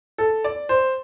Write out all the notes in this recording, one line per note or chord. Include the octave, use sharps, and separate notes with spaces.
A4
D5
C5